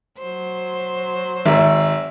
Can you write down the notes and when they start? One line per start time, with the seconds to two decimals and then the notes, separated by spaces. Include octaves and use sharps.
0.18 F#3 C5
1.45 G#1 E5